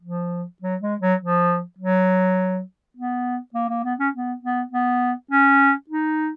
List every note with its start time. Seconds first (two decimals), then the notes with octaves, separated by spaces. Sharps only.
0.02 F3
0.62 F#3
0.81 G#3
1.01 F#3
1.20 F3
1.78 F#3
2.97 B3
3.54 A#3
3.69 A#3
3.84 B3
3.99 C#4
4.14 B3
4.42 B3
4.72 B3
5.31 C#4
5.89 D#4